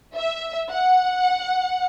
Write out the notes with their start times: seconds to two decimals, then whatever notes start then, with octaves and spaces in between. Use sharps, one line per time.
0.16 E5
0.71 F#5